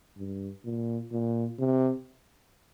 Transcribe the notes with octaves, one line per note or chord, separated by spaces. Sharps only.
G2
A#2
A#2
C3